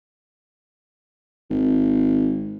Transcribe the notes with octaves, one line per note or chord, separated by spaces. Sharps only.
G#1